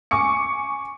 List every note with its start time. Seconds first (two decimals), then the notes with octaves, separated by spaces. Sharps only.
0.11 G#5 C#6 D6 C#7